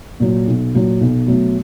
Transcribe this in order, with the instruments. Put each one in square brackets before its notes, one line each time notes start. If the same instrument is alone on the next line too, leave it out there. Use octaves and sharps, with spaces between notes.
[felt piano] A#2 F#3
B1
A#2 F#3
B1
B2 F#3 A3